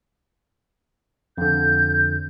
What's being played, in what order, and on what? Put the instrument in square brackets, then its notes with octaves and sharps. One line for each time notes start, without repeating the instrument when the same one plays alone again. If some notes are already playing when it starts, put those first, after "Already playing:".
[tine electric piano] F2 D3 [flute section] G6